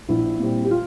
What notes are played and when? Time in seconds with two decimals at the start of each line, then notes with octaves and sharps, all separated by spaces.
0.09 A#1 E4
0.39 A#2 G3 C4
0.65 G4
0.71 F4